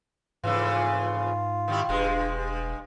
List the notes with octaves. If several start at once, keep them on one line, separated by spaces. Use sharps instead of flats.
F2 G#2 C#3 E3 F4
D#3 G3 E4
E1 G2 G#3